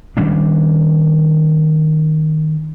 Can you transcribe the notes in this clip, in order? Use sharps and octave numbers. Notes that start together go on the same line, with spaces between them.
D#3 G3 C#4 D4